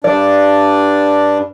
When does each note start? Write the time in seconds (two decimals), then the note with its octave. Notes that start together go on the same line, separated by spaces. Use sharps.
0.04 G2 D4 D5